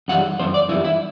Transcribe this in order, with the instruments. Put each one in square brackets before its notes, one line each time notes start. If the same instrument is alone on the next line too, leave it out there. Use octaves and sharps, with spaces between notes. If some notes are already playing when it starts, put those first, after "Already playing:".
[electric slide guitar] F#2 E3 G3 F#5
F#2 E3 C5
D5
F#2 E3 G3 E4
E4